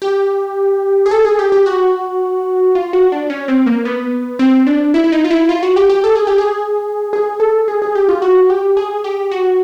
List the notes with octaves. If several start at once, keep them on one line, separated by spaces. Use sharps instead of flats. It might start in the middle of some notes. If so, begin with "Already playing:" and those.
G4
G#4
A4
G#4
G4
G4
F#4
F4
F#4
D4
C#4
C4
A#3
B3
C4
D4
E4
E4
D#4
F4
E4
F4
F#4
G4
G4
A4
G#4
G4
G#4
G#4
A4
G#4
G#4
G4
F4
F#4
G4
G#4
G4
F#4